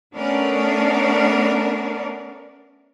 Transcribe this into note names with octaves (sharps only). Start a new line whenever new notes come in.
A3 B3 C#4 D4 A#4 D5